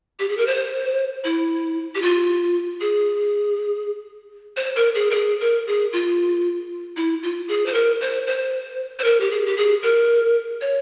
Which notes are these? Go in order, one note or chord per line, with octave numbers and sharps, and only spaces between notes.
G4
G#4
A#4
C5
E4
G4
F4
G#4
C5
A#4
G#4
A#4
G#4
A#4
G#4
F4
E4
F4
G#4
C5
A#4
C5
C5
C5
A#4
G4
G#4
G4
G#4
A#4
C#5